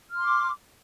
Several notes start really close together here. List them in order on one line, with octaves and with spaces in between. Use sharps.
F6 C6 D6